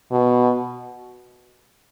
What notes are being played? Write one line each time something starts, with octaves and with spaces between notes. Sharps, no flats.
B2